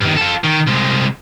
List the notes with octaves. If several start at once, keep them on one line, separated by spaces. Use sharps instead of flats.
G2 D#3
F4 A4
D#3
C2 G#3